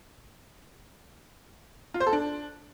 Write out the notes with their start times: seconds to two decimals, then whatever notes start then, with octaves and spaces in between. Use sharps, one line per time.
1.94 F4
2.00 C5
2.07 A4
2.13 D4